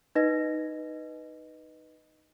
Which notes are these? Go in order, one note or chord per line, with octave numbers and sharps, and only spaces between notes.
D#4 B4 D#5 A#6